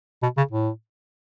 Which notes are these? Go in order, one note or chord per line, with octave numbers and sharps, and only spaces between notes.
B2
C#3
A2